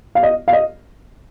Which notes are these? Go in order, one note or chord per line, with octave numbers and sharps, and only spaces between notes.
F5
D#5
F5
D#5